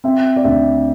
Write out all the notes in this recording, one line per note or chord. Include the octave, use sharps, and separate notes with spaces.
C4 E5
D5
D2 E5